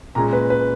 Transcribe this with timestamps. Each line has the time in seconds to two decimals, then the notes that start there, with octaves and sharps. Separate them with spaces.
0.15 A#2 G#3 C#4 A#5
0.33 B4
0.50 B4